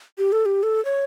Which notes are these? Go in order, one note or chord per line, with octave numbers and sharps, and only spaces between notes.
G4
A4
G4
A4
C#5